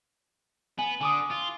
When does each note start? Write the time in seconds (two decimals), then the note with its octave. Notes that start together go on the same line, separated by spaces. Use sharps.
0.79 B3 G#5 F#7
1.01 D3 G#5 D6 D#6
1.31 F4